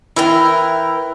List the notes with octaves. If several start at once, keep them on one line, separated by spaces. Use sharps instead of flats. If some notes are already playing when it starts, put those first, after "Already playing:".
E3 E4 A#4 G5